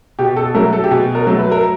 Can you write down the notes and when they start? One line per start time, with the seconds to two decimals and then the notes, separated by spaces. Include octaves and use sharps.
0.19 B2 G4
0.36 A4
0.55 F#3 A3 A#4
0.73 A4
0.84 G4
0.91 B2 G#4
1.15 A#4
1.27 F#3 A3
1.39 B4
1.51 A#4